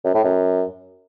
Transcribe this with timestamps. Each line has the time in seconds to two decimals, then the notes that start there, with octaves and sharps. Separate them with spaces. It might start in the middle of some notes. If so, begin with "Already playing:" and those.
0.05 F#2
0.15 A2
0.24 F#2